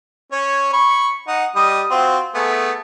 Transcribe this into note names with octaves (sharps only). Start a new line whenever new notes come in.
C#4 C#5
B5 C#6
D#4 F#5
G3 D#5 D#6
C4 F4 F#4
A3 B3 G#4